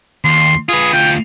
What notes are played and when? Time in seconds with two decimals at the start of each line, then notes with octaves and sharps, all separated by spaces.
0.24 D#2 C6
0.69 F4 G#4 B4
0.93 D2 F4 G5